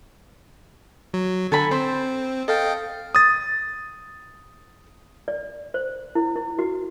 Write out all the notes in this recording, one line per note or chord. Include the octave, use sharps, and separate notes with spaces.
F#3
D3 A4 G#5 B5
C4 C5
A4 D#5 F5 G5
D#6 A6
D5
C5
E4
E4
F#4